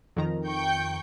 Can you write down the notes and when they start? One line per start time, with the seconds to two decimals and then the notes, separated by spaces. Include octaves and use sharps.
0.16 F2 D#3 A#5
0.47 G5 C#6 G6